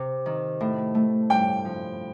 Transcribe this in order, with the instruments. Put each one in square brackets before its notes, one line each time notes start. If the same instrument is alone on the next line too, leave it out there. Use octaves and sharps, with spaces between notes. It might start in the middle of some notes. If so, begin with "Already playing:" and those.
Already playing: [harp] C3
D#3
A2
A3
[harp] G2 [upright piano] G5
[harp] F3